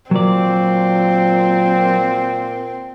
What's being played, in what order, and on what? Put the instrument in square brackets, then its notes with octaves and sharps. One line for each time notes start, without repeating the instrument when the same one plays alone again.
[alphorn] A#2 [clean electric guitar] F#3 D5 [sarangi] C4